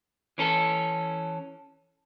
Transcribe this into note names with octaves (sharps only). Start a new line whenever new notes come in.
E3 C#4 A4